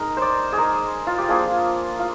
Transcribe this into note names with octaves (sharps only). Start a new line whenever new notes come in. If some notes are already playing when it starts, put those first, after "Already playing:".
Already playing: G#3 D#4 A#4
C5 D5
G#4
G#3 D#4 A#4
F4
G4
F3 A#3 D4 F4 G#4
F4